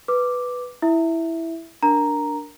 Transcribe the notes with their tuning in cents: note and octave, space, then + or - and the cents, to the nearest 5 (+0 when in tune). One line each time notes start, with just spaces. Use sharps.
B4 +0 D6 +0
E4 +0 E5 +0
D4 +0 A#4 +0 A#5 +0